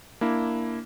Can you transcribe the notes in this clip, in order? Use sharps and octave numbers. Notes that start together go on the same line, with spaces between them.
A#3 D4 E4